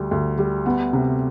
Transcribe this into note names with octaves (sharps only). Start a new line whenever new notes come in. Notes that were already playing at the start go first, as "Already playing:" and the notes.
Already playing: D2 G3
D2
G3
B3
C3